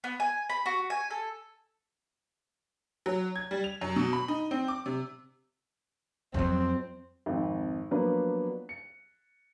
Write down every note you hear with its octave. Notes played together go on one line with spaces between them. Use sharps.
B3
G#5
B5
F#4
G#5
A4
F#3
G#6
G3
F7
F#2
B2
B5
D#4
C4
D6
C3
F2 F#3 C4
G#1 F2
F3 F#3 A#3 B3 D4 B4
C#7